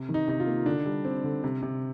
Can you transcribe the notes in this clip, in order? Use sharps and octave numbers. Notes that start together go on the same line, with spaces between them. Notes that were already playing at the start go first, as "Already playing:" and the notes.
Already playing: C3
D#3
D#4
C3 D#4
F4
A#3
D3 D4
G3
C4
D3
C3
C3